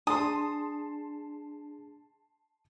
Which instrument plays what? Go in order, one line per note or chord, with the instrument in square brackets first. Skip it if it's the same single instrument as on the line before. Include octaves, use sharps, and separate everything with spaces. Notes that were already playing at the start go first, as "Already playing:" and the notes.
[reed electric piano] D4 G#4 [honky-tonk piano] A5 C6 [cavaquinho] D#6